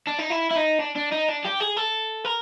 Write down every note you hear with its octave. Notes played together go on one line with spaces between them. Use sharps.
D4
D#4
E4
E4
D#4
D4
D4
D#4
D4
G4
G#4
A4
A#4